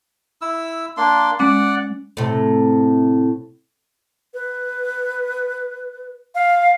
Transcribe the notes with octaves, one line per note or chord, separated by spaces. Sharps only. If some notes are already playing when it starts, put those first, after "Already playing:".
E4 E6
A#3 D4 C6
G#3 C#4 D5 F#5 D6
A2 C3
B4
F5